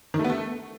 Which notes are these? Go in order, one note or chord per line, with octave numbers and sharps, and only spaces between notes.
D#3
A3
B3
A3